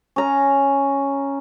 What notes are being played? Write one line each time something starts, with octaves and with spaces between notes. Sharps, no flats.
C#4 A#5